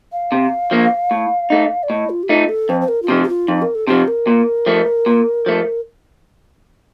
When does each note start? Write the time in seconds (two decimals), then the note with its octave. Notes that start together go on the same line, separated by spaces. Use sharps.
0.12 F5
0.32 C3
0.71 F3 A#3
1.11 A2
1.50 A3 D#4
1.83 D5
1.90 A2 D#5
2.10 F4
2.23 G4
2.29 A3 D#4 F4
2.49 A4
2.69 F2 C5
2.81 C5
2.88 A#4
3.02 F4
3.08 C3 F3 G4
3.23 G4
3.29 F4
3.48 F2 D#4
3.62 A#4
3.75 A4
3.87 C3 F3 G4
4.08 A#4
4.27 A#2
4.66 F3 A3
5.06 A#2
5.46 F3 A3